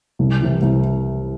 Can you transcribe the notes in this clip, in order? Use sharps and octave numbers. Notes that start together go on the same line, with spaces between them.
C2
C3 E3 G3
C2